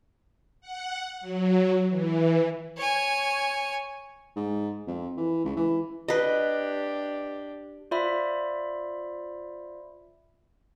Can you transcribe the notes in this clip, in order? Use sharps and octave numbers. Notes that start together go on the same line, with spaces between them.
F#5
F#3
E3
C#5 G#5
G#2
F2
E3
C#2
E3
D4 G4 B4 D#5
F4 C5 D5 E5 B5